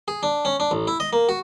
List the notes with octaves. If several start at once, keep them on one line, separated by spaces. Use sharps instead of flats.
G#4
D4
C#4
D4
A1
E4
D#5
A#3
F#4